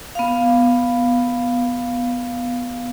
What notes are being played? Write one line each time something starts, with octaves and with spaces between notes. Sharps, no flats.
B3 F5